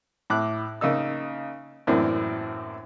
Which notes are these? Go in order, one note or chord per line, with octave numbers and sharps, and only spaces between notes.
A2 D6 F#6
C#3 A#3 D#4 E6
F#2 A2 E3 A#3 C4 D4